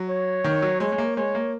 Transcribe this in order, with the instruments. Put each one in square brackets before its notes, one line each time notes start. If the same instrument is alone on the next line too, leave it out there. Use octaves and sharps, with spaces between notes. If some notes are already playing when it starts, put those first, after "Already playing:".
Already playing: [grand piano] F#3
[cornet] C#5
[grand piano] D#3
F#3
[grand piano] G#3 [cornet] C#5
[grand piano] G#3
A#3
[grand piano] G#3 [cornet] C#5
[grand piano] A#3